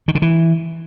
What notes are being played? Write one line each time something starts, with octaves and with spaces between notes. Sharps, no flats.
D#3
D3
E3